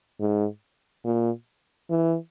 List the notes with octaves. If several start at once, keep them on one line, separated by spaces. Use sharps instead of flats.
G#2
A#2
E3